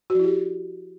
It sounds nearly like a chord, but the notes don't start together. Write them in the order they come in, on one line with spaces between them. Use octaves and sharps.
F#4 F3 E4 G4